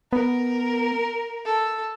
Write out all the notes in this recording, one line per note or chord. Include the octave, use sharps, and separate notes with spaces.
B3 A#4
A4